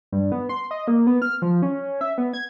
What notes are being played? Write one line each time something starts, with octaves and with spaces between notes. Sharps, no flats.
G2
B3
C6
D#5
A#3
B3
F6
F3
C#4
E5
B3
G#6